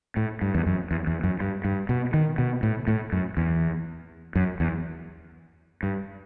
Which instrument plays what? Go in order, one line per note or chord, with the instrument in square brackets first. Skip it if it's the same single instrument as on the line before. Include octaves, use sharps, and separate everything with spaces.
[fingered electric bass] A2
G2
E2
F#2
E2
E2
F#2
G2
G2
B2
D#3
B2
A2
A2
F#2
E2
F#2
E2
G2